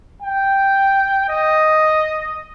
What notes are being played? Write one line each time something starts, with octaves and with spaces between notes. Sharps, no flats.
G5
D#5